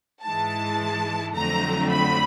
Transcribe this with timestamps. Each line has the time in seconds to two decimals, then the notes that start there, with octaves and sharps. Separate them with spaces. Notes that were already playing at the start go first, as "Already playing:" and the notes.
0.24 G#2 E3 G#3 A5
1.36 F2 D3 F#3 A3 C4 A#5
1.92 B5